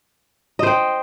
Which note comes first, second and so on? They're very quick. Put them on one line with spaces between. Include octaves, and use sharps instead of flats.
D#5 C5 G5